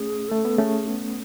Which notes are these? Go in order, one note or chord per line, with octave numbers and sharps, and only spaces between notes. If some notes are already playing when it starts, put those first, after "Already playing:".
Already playing: A3 C#4 G#4
A3 A4
B3
A3 C#4 G#4
B3